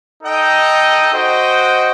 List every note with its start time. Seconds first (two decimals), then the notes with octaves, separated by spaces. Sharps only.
0.22 D#4 A4 D#5 G5
1.13 F#4 C5 D#5 G5